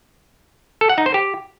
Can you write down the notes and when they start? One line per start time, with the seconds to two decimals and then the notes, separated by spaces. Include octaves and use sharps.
0.81 A4
0.89 F#5
0.98 D#4
1.06 C5
1.14 G4